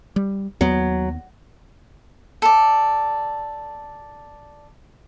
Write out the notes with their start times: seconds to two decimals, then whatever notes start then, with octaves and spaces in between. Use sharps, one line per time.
0.16 G3
0.61 D#2 F#3 B3
2.42 A4 D5